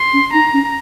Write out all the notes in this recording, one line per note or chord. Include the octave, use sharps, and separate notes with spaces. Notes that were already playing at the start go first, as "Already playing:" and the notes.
Already playing: C6
C#4
D#4 A#5
C#4